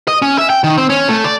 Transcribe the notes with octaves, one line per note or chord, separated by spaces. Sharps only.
D#5
C#4
E5
G5
D#3
C4
C#4
A3
D5